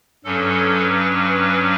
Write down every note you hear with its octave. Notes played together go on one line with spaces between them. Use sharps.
G2 F#3 C#4 A4
B4
B4